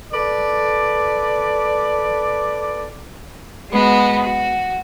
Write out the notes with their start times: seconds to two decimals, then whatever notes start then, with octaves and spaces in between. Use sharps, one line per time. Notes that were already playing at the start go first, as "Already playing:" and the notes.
0.13 A4 B4 D5
3.71 G#3 B3 F#4
4.22 F#4